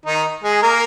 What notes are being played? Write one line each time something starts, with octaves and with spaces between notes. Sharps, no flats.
D#3 D#4
G#3 G#4
A#3 A#4